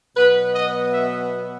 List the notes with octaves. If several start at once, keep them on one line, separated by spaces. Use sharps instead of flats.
B2 F#3 B3 B4
D#5
E5